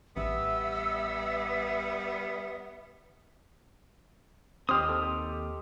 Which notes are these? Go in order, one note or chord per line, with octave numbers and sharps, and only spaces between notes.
A1 G3 B3 E5 E6
D#2 C4 G4 D#5 C6 D#6 F6
A4